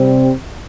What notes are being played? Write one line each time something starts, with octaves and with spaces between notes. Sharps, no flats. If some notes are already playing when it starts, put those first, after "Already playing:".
Already playing: C3 G3 C4